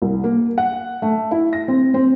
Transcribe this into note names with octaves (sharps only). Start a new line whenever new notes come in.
C2
A#3
F#5
A3
E4
A#6
C4
C4